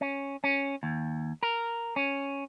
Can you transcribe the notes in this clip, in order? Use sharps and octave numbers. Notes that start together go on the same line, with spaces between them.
C#4
C#4
D#2
A#4
C#4